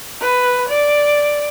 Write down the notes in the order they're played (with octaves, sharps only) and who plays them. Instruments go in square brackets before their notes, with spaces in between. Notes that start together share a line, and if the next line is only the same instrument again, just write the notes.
[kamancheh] B4
D5